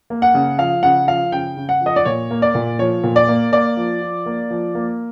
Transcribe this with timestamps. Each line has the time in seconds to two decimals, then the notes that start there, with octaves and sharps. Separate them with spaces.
0.10 A#3
0.22 F#5
0.34 C#3
0.59 F3 F5
0.83 C#3 F#5
1.07 F3 F5
1.32 C#3 G5
1.57 C#3
1.69 F#5
1.81 F3
1.86 D#5
1.96 D5
2.05 A#2 C#5
2.31 A#3
2.42 D5
2.55 A#2
2.79 F3 C#5
3.04 A#2
3.16 D5
3.28 A#3
3.52 A#3 D5
3.77 F3
4.02 F3
4.26 A#3
4.50 F3
4.75 A#3